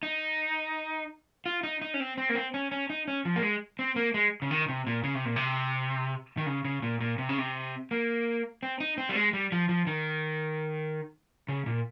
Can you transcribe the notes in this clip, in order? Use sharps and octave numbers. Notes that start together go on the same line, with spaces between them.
D#4
F4
D#4
D#4
C#4
C4
C4
A#3
C4
C#4
C#4
D#4
C#4
F3
A#3
G#3
C4
A#3
G#3
C#3
D#3
C3
A#2
C#3
C3
A#2
C3
D#3
C#3
C#3
A#2
A#2
C3
C#3
C3
A#3
C4
D#4
C4
G3
G#3
G3
F3
F3
D#3
C#3
A#2